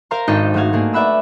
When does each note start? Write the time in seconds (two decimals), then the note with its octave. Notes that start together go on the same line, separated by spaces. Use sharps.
0.11 A#4 C5 F5 A#5 C6
0.28 G#1 D4 D#4 A4 D#5 G5
0.54 G#2 A3 F#4 F5 G#6
0.73 A3 A#3 G#4
0.93 B4 D5 E5 F#5 B5 E6